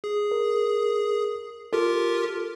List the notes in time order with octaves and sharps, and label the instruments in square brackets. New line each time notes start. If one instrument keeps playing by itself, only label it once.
[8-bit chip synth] G#4
[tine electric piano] A#4
[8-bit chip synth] F4 G4 A#4 [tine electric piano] A4